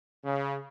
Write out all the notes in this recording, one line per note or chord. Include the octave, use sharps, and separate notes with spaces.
C#3